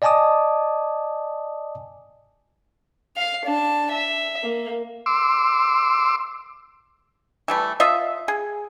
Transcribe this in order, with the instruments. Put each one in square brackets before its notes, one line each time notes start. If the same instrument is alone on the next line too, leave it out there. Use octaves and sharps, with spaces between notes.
[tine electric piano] D5 D#5 G#5 A5 D6 D#6
[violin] F5 C7
D4 A5
E5
A#3
[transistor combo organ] C6 D6 E6
[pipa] E3 G3 A3
F4 D#5 E5
G#4